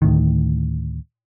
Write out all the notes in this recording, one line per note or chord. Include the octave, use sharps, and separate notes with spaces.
D2 A2 D#3